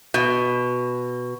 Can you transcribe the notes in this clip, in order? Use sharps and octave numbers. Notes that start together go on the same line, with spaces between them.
B2